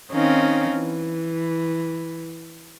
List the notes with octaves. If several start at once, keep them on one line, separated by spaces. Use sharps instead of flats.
D#3 C4 C#4 D#4 F5
E3